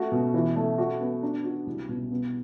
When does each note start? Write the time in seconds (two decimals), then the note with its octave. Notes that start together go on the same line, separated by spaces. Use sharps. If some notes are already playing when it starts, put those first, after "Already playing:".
Already playing: A3 F#4
0.12 B2
0.34 E3
0.56 A3
0.78 F#4
1.00 B3
1.23 D4
1.44 F#4
1.67 C2
1.89 B2
2.11 B3